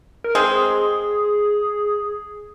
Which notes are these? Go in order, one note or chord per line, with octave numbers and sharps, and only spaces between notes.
A#4
G#3 C4 G#4